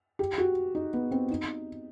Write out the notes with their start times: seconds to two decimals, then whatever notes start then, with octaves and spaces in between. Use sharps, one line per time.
0.19 G4
0.38 F#4
0.75 D#4
0.94 B3
1.11 C4
1.30 D#4